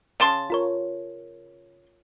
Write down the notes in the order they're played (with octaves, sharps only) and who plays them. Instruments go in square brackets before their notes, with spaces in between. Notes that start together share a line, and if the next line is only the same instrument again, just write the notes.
[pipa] C#3 A5 C6
[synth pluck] F4 A#4 C#5